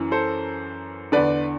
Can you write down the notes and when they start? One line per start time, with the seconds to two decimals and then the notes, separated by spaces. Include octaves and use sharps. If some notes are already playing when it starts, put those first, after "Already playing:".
Already playing: F#2 E3
0.11 A4 C5
1.12 E2 D3 B4 D5